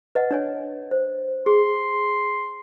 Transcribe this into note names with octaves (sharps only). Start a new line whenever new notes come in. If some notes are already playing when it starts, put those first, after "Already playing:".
B4 D#5 F#5
D4 C#5 G#5
C5
G#4 C6